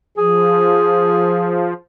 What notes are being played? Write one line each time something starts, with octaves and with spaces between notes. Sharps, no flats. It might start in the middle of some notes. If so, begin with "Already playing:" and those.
F3 G#4